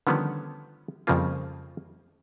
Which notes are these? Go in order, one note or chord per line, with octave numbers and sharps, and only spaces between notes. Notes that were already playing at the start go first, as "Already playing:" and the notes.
D3 D#3 F3 G3 B3 C#4
F2 C#3 F3 G3 A#3 F4